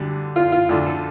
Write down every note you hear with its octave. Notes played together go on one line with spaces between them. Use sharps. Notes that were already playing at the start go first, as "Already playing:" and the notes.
Already playing: D2 D3 G3
F4
F4
D2 D3 A3 F4
A4